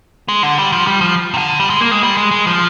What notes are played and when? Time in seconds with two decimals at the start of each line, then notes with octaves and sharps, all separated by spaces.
0.28 G#3
0.43 D3
0.58 G3
0.72 F3
0.87 G3
1.01 F3
1.34 C3
1.38 D3
1.60 G3
1.70 G#3
1.81 A#3
1.91 G#3
2.03 G3
2.17 G#3
2.31 G#3
2.47 F3